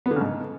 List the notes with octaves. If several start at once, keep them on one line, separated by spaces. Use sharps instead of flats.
B3
D3
C#3
G#2